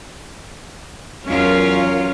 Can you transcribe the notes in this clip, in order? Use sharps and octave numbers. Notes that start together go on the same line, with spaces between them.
E2 F#3 C#4 F4 A#4